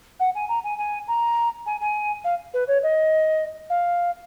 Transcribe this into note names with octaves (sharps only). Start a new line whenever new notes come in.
F#5
G#5
A#5
G#5
G#5
A#5
G#5
G#5
F5
B4
C#5
D#5
F5